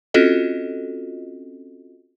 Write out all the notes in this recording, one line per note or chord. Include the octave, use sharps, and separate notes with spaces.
C4 C#4 F4 F#4 A4 D#5